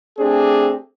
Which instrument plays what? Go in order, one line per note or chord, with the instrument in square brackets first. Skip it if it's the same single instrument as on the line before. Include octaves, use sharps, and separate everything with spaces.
[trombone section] A3 C4 D4 G4 G#4